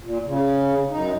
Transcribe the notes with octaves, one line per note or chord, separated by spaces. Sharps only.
A#2
C#3
F#2 D#4